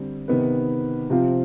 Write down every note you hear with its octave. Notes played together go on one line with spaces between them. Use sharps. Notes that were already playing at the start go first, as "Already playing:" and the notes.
Already playing: D3 G3 C4
C3 D#3 B3 D#4 B4
C3 F3 C4 F4